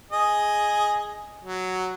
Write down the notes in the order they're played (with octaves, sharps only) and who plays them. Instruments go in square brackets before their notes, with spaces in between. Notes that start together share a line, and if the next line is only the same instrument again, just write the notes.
[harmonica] G#4 D#5
F#3